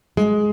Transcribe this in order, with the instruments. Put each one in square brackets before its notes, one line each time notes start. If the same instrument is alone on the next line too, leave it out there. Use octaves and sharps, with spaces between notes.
[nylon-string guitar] G#3